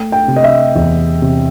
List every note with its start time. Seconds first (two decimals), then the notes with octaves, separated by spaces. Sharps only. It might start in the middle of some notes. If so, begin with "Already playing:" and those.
Already playing: A3 G5
0.12 G5
0.28 C3
0.36 D#5
0.44 E5
0.75 E2
1.22 C3